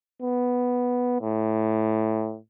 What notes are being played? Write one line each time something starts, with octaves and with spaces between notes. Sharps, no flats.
B3
A2